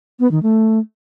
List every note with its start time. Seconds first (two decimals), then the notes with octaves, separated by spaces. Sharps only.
0.20 B3
0.31 D#3
0.43 A3